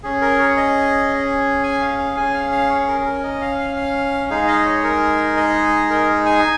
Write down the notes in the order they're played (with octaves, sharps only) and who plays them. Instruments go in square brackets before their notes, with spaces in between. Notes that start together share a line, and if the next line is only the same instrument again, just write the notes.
[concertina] C#4 G#4
A#4
C#5
D#5
G#5
F5
F5
C#4 G#4 G#5
F5
F5
C#5
A#4
G#4
A#4
D#5
F5
F5
F5
G#3 D#4 G#4 F5
D#5
C#5
A#4
D#5
A#4
G#5